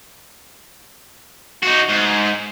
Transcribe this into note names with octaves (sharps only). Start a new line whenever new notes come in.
D#4 F#4
G#2